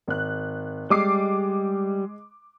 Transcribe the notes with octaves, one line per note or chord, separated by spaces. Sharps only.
G#1 F#6
G3 G#3 D6 C7